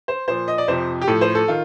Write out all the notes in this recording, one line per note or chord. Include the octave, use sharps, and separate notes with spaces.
C5
A#2 F3 C5
D#5
D5
F2 C3 F3 C5
G4
A2 F3 A4
C5
A4
D#3 F4